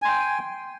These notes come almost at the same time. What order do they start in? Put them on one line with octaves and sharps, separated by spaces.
G#5 C6 G5